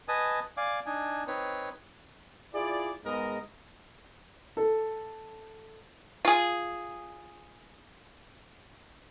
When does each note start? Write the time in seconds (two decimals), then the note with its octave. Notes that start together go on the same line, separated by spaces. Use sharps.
0.08 B4 D#5 G#5 A5 D#6
0.57 D5 F5 G#5 D6
0.86 D4 D#4 G#5
1.27 C4 D#4 B4 C#5
2.54 E4 F4 G#4 D5
3.04 G#2 G#3 B3 A#4 D#5
4.57 A4
6.25 F4 G#4